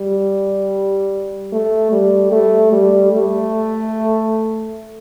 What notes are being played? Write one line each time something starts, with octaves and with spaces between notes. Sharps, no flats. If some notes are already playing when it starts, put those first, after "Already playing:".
Already playing: G3
A3
G3
A3
G3
A3